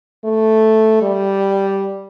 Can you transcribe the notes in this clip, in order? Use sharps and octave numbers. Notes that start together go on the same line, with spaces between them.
A3
G3